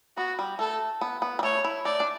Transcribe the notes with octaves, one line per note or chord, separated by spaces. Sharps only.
B3 F#4
G3
A3 A4
B3
B3
G3
A3 C#5
E4
A3 D5
D4